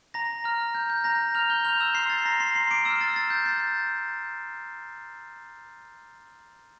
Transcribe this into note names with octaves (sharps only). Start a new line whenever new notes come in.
A#5 A#6
A#5 F6
G6
G6
A#5 A#6
F6 F7
G6 G7
C6 F6 G6 F7
E6 E7
C6 C7
A6
A#5 A#6
C6 C7
C6 C7
D6 D7
C6 E6 F6 E7
A6
A6
G6
A6